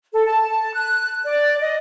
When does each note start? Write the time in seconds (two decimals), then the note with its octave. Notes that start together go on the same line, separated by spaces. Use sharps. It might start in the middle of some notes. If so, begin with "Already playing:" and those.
0.13 A4
0.26 A5
0.73 F#6
1.24 D5
1.61 D#5